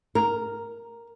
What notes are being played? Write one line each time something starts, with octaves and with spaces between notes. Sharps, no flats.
A#4